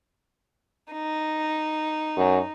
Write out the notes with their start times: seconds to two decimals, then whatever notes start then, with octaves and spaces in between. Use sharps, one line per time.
0.92 D#4
2.16 F#2